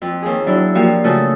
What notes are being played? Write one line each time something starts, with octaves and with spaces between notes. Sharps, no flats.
F2
D#2 G#4
F#3 D4 E4
F3 A#3 F#4 G4
C#3 A3 F4 F#4 A4